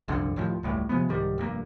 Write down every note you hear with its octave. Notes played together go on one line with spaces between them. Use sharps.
F#1 C2 F2 D3
D#2 A2 D#3 F3
E1 C#2 A2 G3
C3 F3 G#3 B3
C2 G#2 D#3 G3
F1 G2 B2 A#3